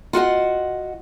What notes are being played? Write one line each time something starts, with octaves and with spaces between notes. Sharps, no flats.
F4 F#4 D#5 F#5